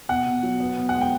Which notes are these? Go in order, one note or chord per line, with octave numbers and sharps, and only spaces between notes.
B2 F#5
B2
F#3
B3
B2
F#5
G#3
G5